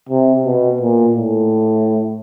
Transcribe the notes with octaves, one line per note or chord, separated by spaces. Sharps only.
C3
B2
A#2
A2